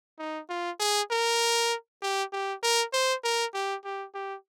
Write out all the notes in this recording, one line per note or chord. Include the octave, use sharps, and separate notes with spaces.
D#4
F4
G#4
A#4
G4
G4
A#4
C5
A#4
G4
G4
G4